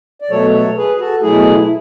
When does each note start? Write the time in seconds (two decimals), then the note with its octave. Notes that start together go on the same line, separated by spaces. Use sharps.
0.21 D5
0.30 B2 F#3 A3 A4 C#5
0.53 A4 C#5
0.77 G#4 B4
0.95 G#4
0.99 F#4 A4
1.22 B2 F#3 A3 E4 G#4
1.59 E4